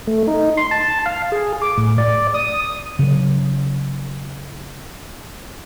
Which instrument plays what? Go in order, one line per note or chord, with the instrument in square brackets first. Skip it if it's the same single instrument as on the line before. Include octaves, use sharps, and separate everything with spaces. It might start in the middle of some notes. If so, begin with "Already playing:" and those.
[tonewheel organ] A3
D#4
C6
A5
F5
G#4
D6
A2
D5
D#6
[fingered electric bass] C#3 F#3